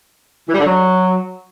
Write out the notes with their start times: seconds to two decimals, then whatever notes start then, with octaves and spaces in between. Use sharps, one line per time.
0.47 E3
0.53 G3
0.59 D3
0.65 F#3